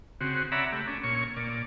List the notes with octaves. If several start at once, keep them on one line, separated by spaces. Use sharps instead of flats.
C#3 C4 F#4
C#5 D5 E5 F#5 A#5 B5
A3 G4
C#4 D4
A#2 C#5 C#6
A#2 D5